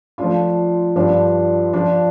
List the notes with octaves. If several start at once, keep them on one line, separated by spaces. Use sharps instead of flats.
F3 A3 D4 F4
G2 F3 D4 F4
F3 D4 F4